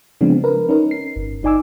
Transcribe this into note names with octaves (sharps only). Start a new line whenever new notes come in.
C#3 F3 G#3 B3 C4 D4
A#4 B4
C#4 D#4 A#4
C7
G1
G#1 D#4 D5 G#5 D6 E6